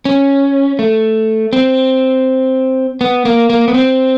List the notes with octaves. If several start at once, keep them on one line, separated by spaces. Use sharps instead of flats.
C#4
A3
C4
B3
A#3
A#3
B3
C4